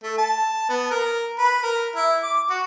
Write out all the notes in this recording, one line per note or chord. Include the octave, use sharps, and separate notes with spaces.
A3
A5
B3
A#4
B4
A#4
E4
D6
F#4